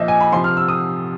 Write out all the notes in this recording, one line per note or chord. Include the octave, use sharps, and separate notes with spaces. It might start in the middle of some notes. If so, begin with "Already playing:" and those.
Already playing: A#2 F3 D#5 E5
G#5
B5
C3 F3 C6
F6
E6
D#6